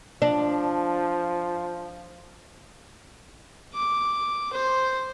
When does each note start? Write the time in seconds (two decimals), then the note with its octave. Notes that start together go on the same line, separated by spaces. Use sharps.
0.22 F3 D4
3.74 D6
4.53 C5